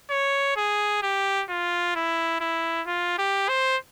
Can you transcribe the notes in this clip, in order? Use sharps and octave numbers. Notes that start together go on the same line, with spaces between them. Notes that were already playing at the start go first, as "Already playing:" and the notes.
C#5
G#4
G4
F4
E4
E4
F4
G4
C5